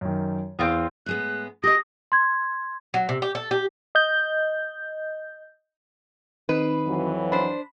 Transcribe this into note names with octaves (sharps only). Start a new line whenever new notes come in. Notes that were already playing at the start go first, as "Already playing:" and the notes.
F#2 D#3
E2 C4 F4 D#6
A2 G#3 B3 F#6
G4 D#5 D#6 A#6
C6 G#6
F#3
C3
G4
A4
G4
D#5 G6
D#3 C4 D#4 B4
F2 E3 F#3
D4 C5 B5